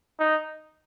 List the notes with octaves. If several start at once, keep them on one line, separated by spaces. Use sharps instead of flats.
D#4